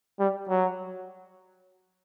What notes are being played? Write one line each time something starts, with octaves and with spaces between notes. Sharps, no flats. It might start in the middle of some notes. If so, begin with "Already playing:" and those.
G3
F#3